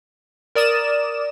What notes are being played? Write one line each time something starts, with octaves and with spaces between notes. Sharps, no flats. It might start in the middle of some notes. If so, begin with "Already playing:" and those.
A#4 D5 D#6 E7